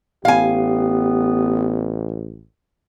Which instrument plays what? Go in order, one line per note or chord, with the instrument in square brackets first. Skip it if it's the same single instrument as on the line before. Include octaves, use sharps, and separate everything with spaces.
[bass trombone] A1 [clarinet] B3 [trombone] G4 [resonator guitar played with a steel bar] F5 G#5